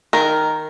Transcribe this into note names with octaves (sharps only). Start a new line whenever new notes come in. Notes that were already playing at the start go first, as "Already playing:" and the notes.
D#3 A#4